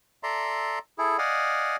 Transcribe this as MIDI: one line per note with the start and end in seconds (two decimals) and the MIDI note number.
0.23 0.79 69
0.23 0.79 74
0.23 0.79 76
0.23 0.79 82
0.23 0.79 84
0.98 1.17 64
0.98 1.17 68
0.98 1.17 69
1.18 1.76 74
1.18 1.76 75
1.18 1.76 77
1.18 1.76 78
1.18 1.76 80